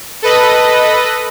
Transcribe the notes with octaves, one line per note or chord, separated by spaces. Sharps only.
A4 B4 D#5